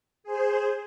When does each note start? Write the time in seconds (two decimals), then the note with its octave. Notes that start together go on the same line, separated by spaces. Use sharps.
0.24 G#4 C5